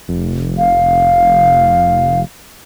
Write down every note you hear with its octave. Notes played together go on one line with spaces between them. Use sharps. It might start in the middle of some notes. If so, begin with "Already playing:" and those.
F1
F5